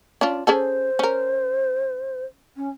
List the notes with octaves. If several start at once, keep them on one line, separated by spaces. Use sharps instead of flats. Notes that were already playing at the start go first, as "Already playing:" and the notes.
C#4 D4 F4
C#4 G#4 A4 C5
C#4 A#4
C#4